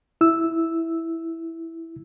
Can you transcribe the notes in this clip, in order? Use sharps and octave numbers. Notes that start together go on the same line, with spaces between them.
E4 E6